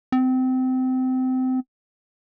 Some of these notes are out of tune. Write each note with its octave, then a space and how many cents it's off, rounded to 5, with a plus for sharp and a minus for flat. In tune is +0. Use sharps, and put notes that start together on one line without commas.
C4 -25